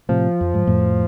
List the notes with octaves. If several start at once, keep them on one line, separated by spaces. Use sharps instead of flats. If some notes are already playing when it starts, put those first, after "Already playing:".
A2 C3 F3
F2
G#2
F2 A2